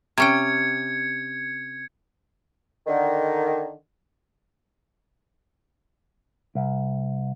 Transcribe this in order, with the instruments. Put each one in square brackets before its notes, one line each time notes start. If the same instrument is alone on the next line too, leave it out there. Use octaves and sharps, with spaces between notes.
[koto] C3 C#4 G5 [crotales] G#6 C#7
[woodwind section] D3 D#3
[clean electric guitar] C2